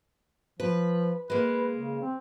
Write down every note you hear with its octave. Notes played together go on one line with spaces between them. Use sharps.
F3 B4
G#3 A#3 B4
C#3
C4